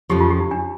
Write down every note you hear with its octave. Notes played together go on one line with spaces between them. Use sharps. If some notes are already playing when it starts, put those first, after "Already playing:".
F2 C#3 F3 G4
F4
G4
D#4
D4